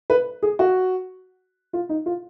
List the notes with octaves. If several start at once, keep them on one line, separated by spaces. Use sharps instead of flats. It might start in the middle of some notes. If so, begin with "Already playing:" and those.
B4
G#4
F#4
F4
D#4
F4